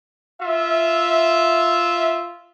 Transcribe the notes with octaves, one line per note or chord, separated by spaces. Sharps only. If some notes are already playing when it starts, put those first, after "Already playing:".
F4 E5